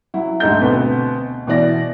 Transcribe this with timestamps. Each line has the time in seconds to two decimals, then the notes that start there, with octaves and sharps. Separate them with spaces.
0.14 F#3 E4
0.40 D2 G#2 D#4 A4 G6
0.61 D2 B2 C4 B4
1.47 B2 E3 D5 A#6